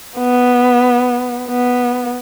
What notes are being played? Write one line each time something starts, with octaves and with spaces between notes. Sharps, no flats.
B3
B3